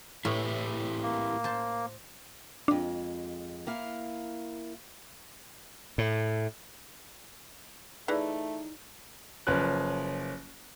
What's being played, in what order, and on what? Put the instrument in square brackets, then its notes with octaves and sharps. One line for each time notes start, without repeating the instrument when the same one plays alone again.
[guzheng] A2 [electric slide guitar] E4 G4 B4
[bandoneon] A#3
[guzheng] C5 A5
[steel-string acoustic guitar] F2 G#3 [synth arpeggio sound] D4
[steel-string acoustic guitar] A#3 E4 F5
[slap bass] A2
[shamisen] E3 [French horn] A3 [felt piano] D#4 [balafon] G#4 D5
[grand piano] F#1 F3 C#4 B4 F#6